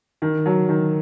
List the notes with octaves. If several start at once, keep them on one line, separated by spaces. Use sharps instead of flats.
D#3
F#3
D#3